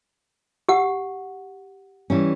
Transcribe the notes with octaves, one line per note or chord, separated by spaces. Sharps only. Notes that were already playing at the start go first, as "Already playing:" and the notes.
G4 F#5
E3 G3 C#4